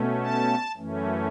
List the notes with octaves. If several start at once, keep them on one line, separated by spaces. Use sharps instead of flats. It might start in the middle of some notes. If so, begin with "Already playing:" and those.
Already playing: B2 A3 C#4
A5
F#2 E3 A3 C#4